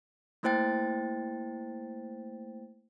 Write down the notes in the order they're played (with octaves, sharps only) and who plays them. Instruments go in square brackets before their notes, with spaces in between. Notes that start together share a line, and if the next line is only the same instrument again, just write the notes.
[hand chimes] A3 A#3 E4 C5 G5 A6